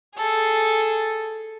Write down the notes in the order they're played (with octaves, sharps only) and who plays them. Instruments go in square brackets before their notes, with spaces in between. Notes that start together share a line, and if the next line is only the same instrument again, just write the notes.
[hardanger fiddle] G#4 A4